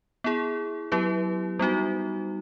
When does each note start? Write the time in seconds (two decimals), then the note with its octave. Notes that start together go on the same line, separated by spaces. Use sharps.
0.24 B3 E4 G#4
0.92 F#3 B3 E4 G4 B4
1.59 G3 B3 D#4 F#4